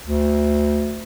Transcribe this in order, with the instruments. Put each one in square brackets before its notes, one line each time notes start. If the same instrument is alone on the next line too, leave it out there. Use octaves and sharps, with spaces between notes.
[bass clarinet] D2